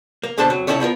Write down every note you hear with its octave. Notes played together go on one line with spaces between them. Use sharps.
A#3
B2 D3 D4 A4 C5 A5
F2 F#3
C2 C#4 D#4 E4 G4 A4
F3 B3 F4 A#4